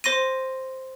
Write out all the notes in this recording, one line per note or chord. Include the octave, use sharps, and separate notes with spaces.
C5 C6 A#6 D#7